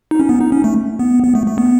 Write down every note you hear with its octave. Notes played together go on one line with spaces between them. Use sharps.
D#4
C#4
B3
D#4
C#4
A3
B3
B3
A3
A3
B3